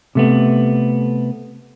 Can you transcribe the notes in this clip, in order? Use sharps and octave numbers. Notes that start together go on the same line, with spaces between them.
C3 A3 B3